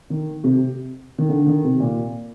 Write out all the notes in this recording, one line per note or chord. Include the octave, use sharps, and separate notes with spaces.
D#3
C3
D#3
D3
D#3
C3
A#2